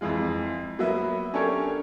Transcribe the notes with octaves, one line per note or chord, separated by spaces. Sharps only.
F2 E3 G#3 F4
F#3 A#3 B3 E5
C#4 D4 G4 A4 A#4 C#5